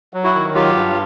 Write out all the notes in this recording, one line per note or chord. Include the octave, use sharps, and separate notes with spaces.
F#3
E4 F#4
D#3
F#3 F4 G4
G2